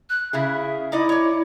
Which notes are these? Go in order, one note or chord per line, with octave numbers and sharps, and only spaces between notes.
F#6
C#3 E4 G#4 E5
D#4 E4 D5 D#5
C#5 D5